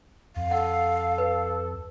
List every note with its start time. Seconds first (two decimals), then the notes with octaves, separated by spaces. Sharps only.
0.36 F2 F5
0.51 A4 F#5
1.18 B4